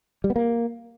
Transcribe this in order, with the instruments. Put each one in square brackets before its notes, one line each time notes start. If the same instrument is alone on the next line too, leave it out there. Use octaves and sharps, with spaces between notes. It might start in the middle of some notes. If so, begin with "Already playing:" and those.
[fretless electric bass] G3
B3
A#3